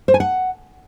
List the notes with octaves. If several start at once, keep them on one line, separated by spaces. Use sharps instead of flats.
C5
G#5
F#5